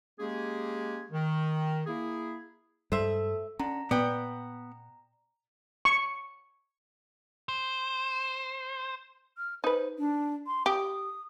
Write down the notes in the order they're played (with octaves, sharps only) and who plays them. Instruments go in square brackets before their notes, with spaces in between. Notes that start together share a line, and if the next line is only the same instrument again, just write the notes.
[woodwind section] G#3 A#3 C#4 G4 G#4
D#3
A#3 E4 G#4
[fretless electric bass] G2 G3 G#3 [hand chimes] A4 [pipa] C5 E5
[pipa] D3 [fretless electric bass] C#4 [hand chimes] A#5
[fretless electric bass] A#2 [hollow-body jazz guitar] B3 [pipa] D5 G5
[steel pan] C#6
[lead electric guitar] C5
[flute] F6
[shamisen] D#4 B4 [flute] C5
[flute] D4
C6
[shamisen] G4 [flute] D#6